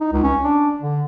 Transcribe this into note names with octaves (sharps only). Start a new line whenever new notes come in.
D#4
C#2
C#4
D4
D3